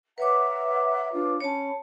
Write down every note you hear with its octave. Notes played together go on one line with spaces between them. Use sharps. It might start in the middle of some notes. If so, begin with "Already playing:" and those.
B4 C#5 E5 F#5 A#5 D6
D4 F4
C#4 C#5 A5 B5